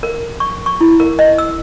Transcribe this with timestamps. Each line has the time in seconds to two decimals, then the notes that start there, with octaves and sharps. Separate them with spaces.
0.03 A#4
0.40 C#6
0.66 C#6
0.81 E4
1.00 A#4
1.19 D#5
1.38 E6